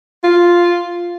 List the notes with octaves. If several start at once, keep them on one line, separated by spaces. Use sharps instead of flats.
F4